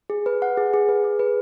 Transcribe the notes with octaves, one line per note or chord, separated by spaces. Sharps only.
G#4
B4
F#5
G#4
G#4
B4
G#4
B4